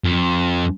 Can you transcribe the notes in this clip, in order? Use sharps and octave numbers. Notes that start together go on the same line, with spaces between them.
F2